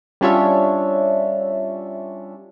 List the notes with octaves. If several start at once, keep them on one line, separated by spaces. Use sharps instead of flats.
G3 C#4 D4 F4 C#5 E5